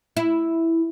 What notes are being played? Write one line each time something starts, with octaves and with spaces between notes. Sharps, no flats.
E4